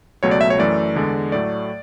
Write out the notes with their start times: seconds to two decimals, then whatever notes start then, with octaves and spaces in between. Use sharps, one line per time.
0.23 C#2 B2 F#3 A3 C#5
0.31 D5
0.41 E5
0.50 C#5
0.58 F#2 E3 A3 D5
0.95 E2 D3 G#3
1.32 A2 F#3 A3 D5